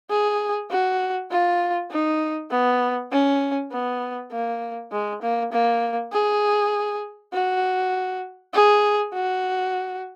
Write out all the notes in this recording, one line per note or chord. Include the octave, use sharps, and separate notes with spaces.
G#4
F#4
F4
D#4
B3
C#4
B3
A#3
G#3
A#3
A#3
G#4
F#4
G#4
F#4